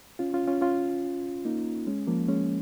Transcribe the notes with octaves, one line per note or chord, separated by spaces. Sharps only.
C#4 F4
C#4 F4
C#4 F4
C#4 F4
A#3 D#4
G#3 C#4
F3 A#3
G#3 C#4